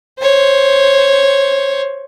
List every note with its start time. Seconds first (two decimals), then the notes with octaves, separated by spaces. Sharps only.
0.19 C5 C#5